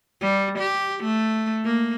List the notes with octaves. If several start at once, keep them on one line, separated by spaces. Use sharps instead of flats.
G3
G4
A3
A#3